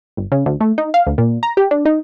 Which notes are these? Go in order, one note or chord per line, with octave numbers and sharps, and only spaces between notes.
G1
C#3
D2
A3
D#4
F5
D2
A#2
A#5
G4
D4
D#4